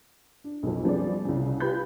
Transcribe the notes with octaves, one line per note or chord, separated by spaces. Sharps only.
D4
B1 F2
F3 G3 B3 C#4 G#4 D5
C2 C#3
F4 G4 B4 B5 G6